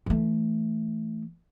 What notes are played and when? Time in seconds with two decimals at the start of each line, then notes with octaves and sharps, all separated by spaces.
0.06 E3 A3